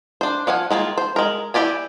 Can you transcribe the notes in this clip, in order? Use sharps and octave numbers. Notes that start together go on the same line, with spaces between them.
D4 C5
F3 F5 F#5 G#5
D#3 G#3 A#3 F4
C5
G#3 A#4
E3 F#4 G4 D5 G#5